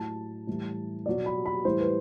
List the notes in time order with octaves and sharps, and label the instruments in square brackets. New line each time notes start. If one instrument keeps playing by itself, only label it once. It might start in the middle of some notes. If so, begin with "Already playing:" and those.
Already playing: [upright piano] A2 F#3 A5
A2 E3 G3
B2 F#3 D5
B5
B5
A2 E3 G3 C5
B4